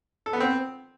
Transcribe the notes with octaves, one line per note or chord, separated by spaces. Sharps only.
A4
B3
C4